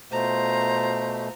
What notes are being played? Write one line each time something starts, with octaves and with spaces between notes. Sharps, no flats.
B2 A3 F4 C5 A#5